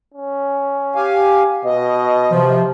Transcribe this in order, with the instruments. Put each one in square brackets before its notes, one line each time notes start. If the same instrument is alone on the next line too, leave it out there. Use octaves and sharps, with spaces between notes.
[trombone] C#4
[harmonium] G4 F5 G#5
[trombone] B2 [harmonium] D#5
[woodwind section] C3 F3